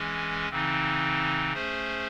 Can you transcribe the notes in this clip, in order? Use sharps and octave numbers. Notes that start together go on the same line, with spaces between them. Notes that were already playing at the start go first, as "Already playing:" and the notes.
Already playing: E3 G#3 C#4 G#4
C#3 E3 C4 D#4
A3 C#4 G#4 C5